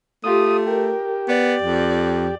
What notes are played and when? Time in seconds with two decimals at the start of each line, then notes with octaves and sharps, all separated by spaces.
0.24 A3 F4 G4 D#6
0.67 G4 A#4
1.28 B3 D5
1.62 F2